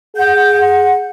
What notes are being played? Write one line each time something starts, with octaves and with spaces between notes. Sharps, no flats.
G#4 F#5 G6
F#5